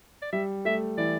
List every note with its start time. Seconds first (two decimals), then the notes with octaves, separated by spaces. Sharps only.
0.22 D5
0.33 G3 E5
0.65 A3 E5
0.98 E3 D5